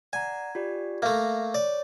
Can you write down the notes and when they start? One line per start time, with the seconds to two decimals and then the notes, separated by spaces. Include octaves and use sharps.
0.13 D5 F#5 G#5 A#5
0.55 F4 G4 D5
1.02 A3 A#3 E5 F6
1.54 C#5 D5